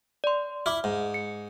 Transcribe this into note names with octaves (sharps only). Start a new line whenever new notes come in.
D5 C6
E4 D6 F6
G#2
C#7